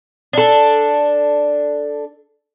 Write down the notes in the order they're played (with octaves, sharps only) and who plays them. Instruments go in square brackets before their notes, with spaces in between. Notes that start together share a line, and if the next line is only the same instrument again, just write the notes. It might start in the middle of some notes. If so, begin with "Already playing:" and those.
[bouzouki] D4 A4